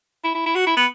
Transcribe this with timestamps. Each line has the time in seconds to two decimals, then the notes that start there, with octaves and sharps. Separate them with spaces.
0.24 E4
0.35 E4
0.46 E4
0.55 F#4
0.67 E4
0.76 B3